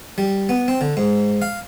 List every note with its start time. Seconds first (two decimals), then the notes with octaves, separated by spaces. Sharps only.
0.18 G3
0.49 B3
0.68 C4
0.81 D3
0.97 G#2
1.42 F5